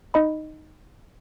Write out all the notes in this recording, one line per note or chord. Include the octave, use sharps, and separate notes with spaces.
D#4 D#5 B5